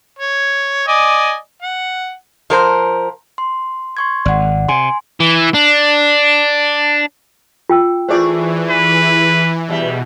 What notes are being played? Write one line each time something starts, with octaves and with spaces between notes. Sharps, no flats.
C#5
D5 D#5 G#5
F#5
F3 A#4 C5
C6
C6 C#6 G#6
G#1 D5 F#5
C3 G#5 C6
E3
D4
F4 G5 E6
E3 A3 F4 G#4 C5 D5
B4
E2 B2 G3 E5